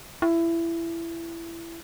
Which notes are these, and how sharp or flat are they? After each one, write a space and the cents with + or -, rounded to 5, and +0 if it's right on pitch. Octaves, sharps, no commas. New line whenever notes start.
E4 +20